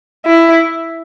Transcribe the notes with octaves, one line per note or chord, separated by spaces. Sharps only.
E4